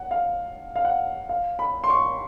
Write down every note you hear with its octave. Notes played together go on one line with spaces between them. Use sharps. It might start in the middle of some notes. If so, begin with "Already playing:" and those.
Already playing: F#5
F5
F5
F#5
F5
B5
C6
C#6